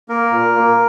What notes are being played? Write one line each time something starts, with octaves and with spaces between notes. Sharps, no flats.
A#3 A#4
A#2
A#3